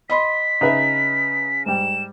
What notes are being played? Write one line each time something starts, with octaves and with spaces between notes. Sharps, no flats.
D#5 B5 C6 B6
C#3 D#4 B4 E5
G#2 G3 E7